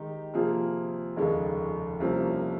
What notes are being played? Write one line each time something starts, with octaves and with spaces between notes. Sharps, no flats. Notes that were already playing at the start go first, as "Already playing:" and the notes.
Already playing: D#3 G#3 D#4 G4
C3 F3 A#3 F4 G#4
F1 D#2 C#3 G#3
C2 C3 F3 A#3 C#4